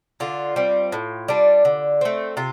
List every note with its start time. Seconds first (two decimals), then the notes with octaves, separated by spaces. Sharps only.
0.20 D3 F4
0.56 G3 C4
0.92 A2
1.28 G3 D4
1.65 D3
2.01 A3 C4
2.37 C3 F4